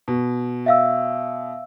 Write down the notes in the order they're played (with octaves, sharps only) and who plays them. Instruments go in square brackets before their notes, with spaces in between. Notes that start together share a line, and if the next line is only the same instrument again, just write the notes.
[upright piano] B2
[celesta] E5 F5 E6